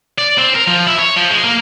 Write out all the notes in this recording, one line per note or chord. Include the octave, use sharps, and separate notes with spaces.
D5
C4
A#4
F3
E4
C#5
F3
G#3
A#3